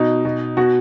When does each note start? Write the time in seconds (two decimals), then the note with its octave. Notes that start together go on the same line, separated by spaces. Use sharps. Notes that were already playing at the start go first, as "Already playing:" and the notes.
Already playing: B2 D#4
0.25 B2
0.57 B2 F#4